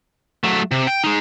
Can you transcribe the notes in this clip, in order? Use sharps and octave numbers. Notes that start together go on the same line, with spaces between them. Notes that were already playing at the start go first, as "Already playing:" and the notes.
F#3 A3
C3
G5
G#3 D#4